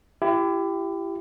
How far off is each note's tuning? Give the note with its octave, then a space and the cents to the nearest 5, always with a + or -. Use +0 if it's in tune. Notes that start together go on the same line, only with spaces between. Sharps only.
E4 +35 G4 +0